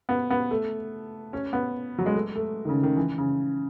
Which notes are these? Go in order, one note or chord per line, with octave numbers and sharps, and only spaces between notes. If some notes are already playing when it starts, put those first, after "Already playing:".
B3
B3
A3
C#4
B3
F#3
G#3
A3
A3
D#3
C#3
D#3
E3
C#3